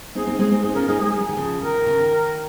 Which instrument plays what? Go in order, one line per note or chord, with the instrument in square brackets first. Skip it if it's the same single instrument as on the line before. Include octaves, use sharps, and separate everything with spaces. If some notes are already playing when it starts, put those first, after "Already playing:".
[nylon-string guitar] C4 D#4 [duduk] G#4
[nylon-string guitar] C4 D#4
[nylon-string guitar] G#3 C4 [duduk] G#4
[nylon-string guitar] C4 D#4
[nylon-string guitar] C4 D#4 [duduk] G#4
[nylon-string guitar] C#4 F4 [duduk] A#4
[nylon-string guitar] C4 D#4 [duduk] G#4
[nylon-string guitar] G#3 C4 [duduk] G#4
[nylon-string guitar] G3
F3
D#3
C#3 F3
[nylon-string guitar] D#3 [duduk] A#4
[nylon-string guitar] D#3
C#3
D#3